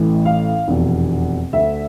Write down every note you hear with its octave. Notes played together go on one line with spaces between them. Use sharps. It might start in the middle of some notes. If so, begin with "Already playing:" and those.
Already playing: A1 A2 E3
F5
F1 E2 B2
D2 D3 E5